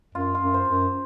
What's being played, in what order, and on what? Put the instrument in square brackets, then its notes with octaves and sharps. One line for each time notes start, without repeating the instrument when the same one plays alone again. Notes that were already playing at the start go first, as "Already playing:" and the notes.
[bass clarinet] F#2 [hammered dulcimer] F4
[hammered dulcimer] F4
[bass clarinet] F#2
[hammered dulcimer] C5
[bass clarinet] F#2